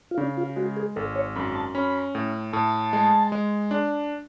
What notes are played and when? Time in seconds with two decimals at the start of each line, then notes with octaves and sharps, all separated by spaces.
0.11 F4
0.18 C#3 D4
0.37 F4
0.56 G#3 F#4
0.77 G#4
0.96 G#1 A4
1.15 C#5
1.36 F#2 B5
1.55 A5
1.75 C#4 B5
2.15 A2
2.53 A2 A5
2.93 G#3
3.32 G#3
3.71 D4